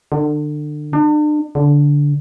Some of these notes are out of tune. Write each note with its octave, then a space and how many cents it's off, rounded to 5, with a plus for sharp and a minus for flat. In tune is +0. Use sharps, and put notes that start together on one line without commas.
D3 +30
D4 +40
D3 -15